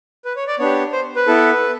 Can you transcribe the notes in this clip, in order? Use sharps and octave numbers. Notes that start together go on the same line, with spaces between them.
B4
C#5
D5
B3 D4 G4 C#5
C5
B4
B3 E4 A4